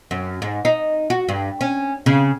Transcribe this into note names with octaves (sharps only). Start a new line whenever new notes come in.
F#2
G#2
D#4
F#4
G2
C#4
C#3